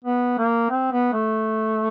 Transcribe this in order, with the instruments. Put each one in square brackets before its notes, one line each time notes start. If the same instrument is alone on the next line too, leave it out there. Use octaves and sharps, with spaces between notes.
[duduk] B3
A#3
C4
B3
A3